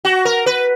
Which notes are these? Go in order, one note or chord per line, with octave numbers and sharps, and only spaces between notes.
F#4
A#4
B4